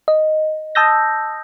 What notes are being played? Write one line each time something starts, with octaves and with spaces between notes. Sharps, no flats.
D#5
A5 D#6 E6 G6 A#6